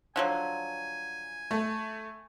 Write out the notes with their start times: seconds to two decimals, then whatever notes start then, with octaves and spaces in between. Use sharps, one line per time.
0.16 D3 F3 F#3 G#5
1.51 A3